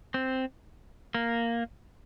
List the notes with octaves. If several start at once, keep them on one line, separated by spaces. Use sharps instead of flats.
C4
A#3